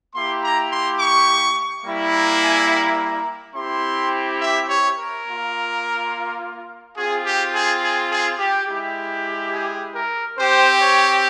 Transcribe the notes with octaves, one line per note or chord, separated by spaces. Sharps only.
A#3 E4 G4 C6
A#5
C6
C#6
G3 A#3 E4
A#5
G#5
A#5
C4 E4 G4 C6
E5
C#5
A#4
A#3 F4
C4 F4 G#4
G4
G#4
G#4
G#4
G4
G#3 E4 G4
G#4
A#4
C4 G4 C5
C#5